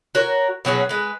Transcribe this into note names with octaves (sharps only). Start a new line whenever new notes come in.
F#4 A#4 C#5
B2 F#3 C#4 G#4
G#3 B4